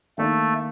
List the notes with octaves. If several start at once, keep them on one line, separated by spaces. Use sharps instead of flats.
D#3 A3 A#3 D4 A4